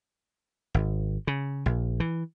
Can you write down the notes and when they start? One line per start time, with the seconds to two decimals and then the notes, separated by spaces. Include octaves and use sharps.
0.74 G#1
1.27 C#3
1.66 A#1
2.00 E3